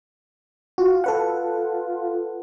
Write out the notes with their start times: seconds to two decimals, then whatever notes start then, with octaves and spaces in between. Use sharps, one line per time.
0.78 F4 F#4
1.04 A4 B4 F#5